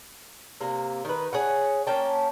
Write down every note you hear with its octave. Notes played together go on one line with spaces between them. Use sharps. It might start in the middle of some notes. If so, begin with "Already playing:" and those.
C3 A#3
D#3 B4
G#4 C#5 F#5
A#3 C#4 G5 A5